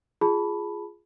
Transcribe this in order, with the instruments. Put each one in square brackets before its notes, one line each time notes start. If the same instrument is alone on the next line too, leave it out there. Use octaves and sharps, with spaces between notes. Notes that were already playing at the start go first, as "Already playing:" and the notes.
[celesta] F4 G#4 A5 B5